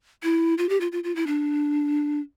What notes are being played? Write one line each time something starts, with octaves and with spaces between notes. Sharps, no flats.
E4
F4
G4
F4
F4
F4
E4
D4